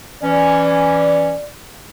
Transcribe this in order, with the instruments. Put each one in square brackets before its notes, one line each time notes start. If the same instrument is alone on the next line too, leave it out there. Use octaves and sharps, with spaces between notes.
[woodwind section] E3 C#4 [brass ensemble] D5